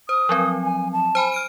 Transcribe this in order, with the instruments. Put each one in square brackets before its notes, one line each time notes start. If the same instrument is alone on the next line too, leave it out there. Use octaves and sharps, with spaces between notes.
[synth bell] C5 [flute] D#6
[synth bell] F3 F#3 C4
[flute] G#5
A5
[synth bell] C5 G#5 B5
F6 D7 D#7